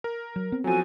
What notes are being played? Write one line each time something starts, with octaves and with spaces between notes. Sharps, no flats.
A#4
F#3
B3 C4
F3 F#3 F#4 A4 G#5